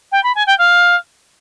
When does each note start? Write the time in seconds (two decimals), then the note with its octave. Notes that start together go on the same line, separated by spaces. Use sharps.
0.12 G5
0.23 B5
0.35 G#5
0.46 G5
0.58 F5